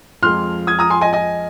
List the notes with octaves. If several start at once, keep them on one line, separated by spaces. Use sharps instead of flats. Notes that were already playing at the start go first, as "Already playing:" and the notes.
F2 F3 G#3 C6 F6
D#6 G#6
A#5 D#6
G#5 C6
D#5 G#5
D#5 G#5